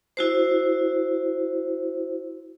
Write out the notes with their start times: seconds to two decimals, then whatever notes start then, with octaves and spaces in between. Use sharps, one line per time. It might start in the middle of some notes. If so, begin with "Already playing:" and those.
0.17 E4 F#4 C5